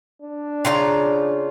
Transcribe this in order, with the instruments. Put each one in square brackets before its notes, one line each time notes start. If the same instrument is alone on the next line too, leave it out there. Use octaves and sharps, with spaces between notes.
[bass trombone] D4
[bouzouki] C#3 F4 A#5